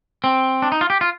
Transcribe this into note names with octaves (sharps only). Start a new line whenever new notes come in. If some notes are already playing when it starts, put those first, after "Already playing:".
C4
D4
D#4
F4
G4
F4